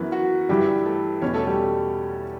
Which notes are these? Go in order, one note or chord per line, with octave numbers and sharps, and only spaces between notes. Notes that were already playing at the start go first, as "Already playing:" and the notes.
Already playing: F#2 E3 B3 B4
F#4
G2 E3 G3 G4
A3 A4
E2 B2 C#4 C#5
A3 A4
G3 G4